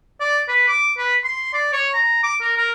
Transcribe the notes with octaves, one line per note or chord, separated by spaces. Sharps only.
D5
B4
D6
B4
C6
D5
C#5
A#5
D6
A#4
A#4